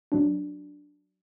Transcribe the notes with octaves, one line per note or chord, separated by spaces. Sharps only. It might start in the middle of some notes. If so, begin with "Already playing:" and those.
F#3 D4